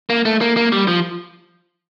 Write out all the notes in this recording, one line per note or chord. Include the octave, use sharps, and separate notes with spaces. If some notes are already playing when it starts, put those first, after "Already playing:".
A#3
A3
A#3
A#3
G3
F3